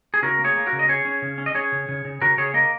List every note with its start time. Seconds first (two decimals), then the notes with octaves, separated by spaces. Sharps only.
0.14 G#4
0.22 C#3 F#4 A#4
0.39 A#3
0.44 G#4 C#5
0.56 A#3
0.66 F#4 A#4
0.73 C#3
0.79 D#5
0.88 C#4 G#4 C#5
1.05 C#4
1.22 C#3
1.38 C#4
1.46 D#5
1.55 C#4 G#4 C#5
1.72 C#3
1.89 C#3
2.05 C#3
2.21 C#3 F#4 A#4
2.37 C#3 G#4 C#5
2.54 A#3 A#4 D#5